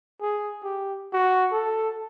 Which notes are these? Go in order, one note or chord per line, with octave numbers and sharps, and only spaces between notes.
G#4
G4
F#4
A4